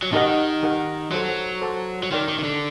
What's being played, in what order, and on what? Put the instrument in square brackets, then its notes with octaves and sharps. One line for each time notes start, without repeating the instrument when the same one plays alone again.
[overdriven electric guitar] F#3
[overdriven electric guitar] D#3 [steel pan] D#4 G4 A#4 D#5 F#5
[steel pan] D#4 G4 A#4 D#5 F#5
[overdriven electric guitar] F#3 [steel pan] A4 C5 F#5 A5 C6
[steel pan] A4 C5 F#5 A5 C6
[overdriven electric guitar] F#3
[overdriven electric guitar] D#3 [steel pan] A#4 D5 G5 C6
[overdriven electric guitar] D#3
D#3
D3